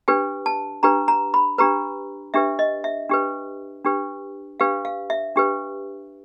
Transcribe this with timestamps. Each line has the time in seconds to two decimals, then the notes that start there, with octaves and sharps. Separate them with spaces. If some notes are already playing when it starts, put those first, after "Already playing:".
0.08 D4 G4 B4 G#5
0.46 A5
0.83 D4 G4 B4 A#5
1.08 A#5
1.34 B5
1.58 D4 G4 B4 A#5
2.34 D4 G4 B4 E5
2.59 D#5
2.84 E5
3.09 D4 G4 B4
3.85 D4 G4 B4
4.60 D4 G4 B4 F5
4.85 F5
5.10 E5
5.36 D4 G4 B4